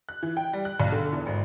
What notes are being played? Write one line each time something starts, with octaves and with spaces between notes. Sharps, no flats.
F#6
E3
G5
G3
F#6
B1
D3
E2
G#1